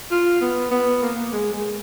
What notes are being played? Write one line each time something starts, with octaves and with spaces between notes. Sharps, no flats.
F4
B3
B3
A#3
G#3
G#3